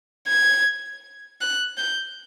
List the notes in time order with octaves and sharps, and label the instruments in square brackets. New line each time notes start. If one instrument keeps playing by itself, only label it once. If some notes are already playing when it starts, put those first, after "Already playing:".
[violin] G#6
F#6
G6